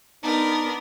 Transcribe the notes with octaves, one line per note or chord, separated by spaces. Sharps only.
B3 D4 D#4 A#4